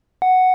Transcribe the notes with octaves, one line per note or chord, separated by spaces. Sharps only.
F#5